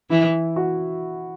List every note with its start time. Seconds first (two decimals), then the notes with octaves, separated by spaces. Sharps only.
0.10 E3 E4
0.56 F#4